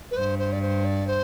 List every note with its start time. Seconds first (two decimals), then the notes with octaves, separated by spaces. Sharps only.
0.10 B4
0.16 G2 C5
0.38 C5
0.52 D5
0.61 C5
0.84 D5
1.07 C5